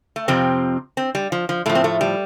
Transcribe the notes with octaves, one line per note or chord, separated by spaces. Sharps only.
A3
F2 C3 F3 C4
C4
G3
F3
F3
A2 F3 A3
C4
A3
G3